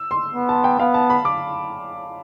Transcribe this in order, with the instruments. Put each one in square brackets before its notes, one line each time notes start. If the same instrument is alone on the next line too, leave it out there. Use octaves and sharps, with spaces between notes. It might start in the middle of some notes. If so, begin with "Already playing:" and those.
Already playing: [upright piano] E6
C6
[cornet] B3
[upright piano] A5
G5
[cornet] B3 [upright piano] F5
[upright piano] A5
B5
D6